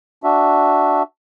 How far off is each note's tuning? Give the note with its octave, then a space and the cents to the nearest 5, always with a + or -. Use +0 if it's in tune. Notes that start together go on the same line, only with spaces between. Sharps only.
D4 +0 F#4 +0 E5 +0